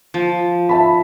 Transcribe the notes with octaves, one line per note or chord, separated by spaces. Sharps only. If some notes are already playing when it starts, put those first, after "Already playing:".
F3
E5 A5 B5